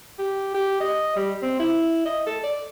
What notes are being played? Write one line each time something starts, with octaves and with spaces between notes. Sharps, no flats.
G4
G4
D#5
G3
C4
E4
D#5
A4
D5